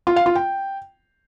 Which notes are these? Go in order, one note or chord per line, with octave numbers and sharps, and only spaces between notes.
F4
F5
F4
G5